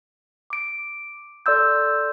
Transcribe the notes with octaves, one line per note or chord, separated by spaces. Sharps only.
D6 D7
A4 D5 C6 E6 G6